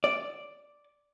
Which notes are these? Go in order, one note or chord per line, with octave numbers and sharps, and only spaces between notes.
D5